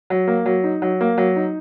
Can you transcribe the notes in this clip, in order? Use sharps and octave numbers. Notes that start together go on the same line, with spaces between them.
F#3
A#3
F#3
D#4
F#3
A#3
F#3
D#4